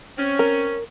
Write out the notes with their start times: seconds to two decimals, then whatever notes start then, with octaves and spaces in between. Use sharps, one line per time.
0.18 C4 C#4
0.39 A#4